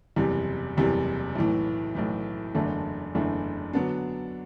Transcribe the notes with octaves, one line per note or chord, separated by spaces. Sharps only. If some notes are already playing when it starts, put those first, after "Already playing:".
F#1 E2 C3 G3
F#1 E2 C3 G3
B1 A2 E3
B1 A2 E3
F#1 E2 D3 A3 D4
F#1 E2 D3 A3 D4
D3 F#3 B3 D4